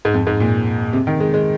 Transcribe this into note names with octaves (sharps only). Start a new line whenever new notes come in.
G#2
F2
G#2
A#2
C3
D#3
G#3
G#3